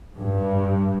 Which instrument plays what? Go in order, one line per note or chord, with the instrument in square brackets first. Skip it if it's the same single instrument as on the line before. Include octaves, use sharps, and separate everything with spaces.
[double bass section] G2